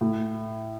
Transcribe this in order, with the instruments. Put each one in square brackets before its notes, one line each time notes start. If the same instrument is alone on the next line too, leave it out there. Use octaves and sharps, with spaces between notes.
[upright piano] A2